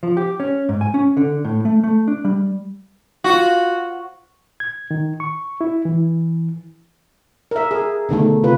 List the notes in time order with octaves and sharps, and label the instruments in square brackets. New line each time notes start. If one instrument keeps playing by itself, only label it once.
[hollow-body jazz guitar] F3
G4
C#4
G#2
G#5
C#4
D3
A2
A3
A3
D4
G3
[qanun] F4 C5 [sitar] F#4
[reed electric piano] G#6
D#3
C#6
E4
E3
[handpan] A#4 E5
G#4
B2 D3 D#3 A3
C3 F4 B4